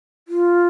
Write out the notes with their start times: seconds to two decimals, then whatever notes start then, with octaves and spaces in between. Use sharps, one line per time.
0.28 F4